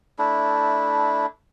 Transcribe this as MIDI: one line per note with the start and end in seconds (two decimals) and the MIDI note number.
0.19 1.26 57
0.19 1.26 62
0.19 1.26 64